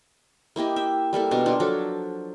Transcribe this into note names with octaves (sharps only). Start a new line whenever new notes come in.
A#3 E4 G4 D#5
E5 G5
G3 A#3 A4 E5
B2 D4 A#4
A#3 D4 F4
F3 F#3 A4